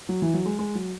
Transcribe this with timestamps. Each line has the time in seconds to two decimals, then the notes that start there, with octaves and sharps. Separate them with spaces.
0.09 F#3
0.22 E3
0.34 F#3
0.46 G#3
0.59 G#3
0.75 F#3